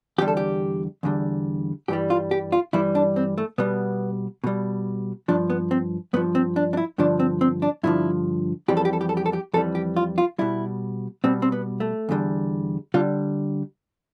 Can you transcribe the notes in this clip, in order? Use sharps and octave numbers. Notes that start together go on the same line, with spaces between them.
E2 D3 G3 G4
A4
G4
E2 D3 G3
G2 E3 G3 G4
F4
G4
F4
G2 E3 G3 E4
D4
C4
A3
B2 G3 B3
B2 G3
G2 F3 D4
B3
C4
G2 F3 B3
C4
D4
D4
E4
G2 D3 F3 D4
C4
C4
D4
G2 D3 F3 E4
F2 E3 G3 G4
A4
G4
A4
G4
A4
G4
A4
G4
F2 E3 G3 A4
G4
F4
F4
B2 G3 E4
B2 G3 C4
C4
B3
A3
E2 D3 G3
D3 G3 F4